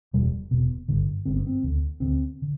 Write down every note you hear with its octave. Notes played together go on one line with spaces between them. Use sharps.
E1 E2 B2 G3
E1 E2 B2 B3
G1 G2 D3
G1 G2 D3 C4
B3
C4
D2 D3
D2 D3 C4
D3